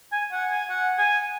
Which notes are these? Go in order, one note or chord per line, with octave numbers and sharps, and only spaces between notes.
G#5
F#5
G#5
F#5
G#5